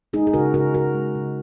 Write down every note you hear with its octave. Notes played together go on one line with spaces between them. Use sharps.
G#3 D#4 G#4
G#4
C#3 F#4 A#4
C#3 F#4 A#4
C#3 F#4 A#4
G#3
C#3